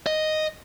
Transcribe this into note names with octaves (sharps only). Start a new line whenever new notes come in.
D#5